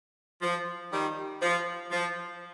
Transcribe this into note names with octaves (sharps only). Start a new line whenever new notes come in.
F3
D#3 G3
F3
F3